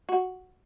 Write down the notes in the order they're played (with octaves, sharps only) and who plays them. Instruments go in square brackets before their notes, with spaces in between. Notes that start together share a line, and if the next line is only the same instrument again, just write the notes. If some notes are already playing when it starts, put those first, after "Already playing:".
[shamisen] F#4